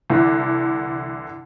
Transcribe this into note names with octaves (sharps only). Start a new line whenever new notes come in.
C2 D3 E3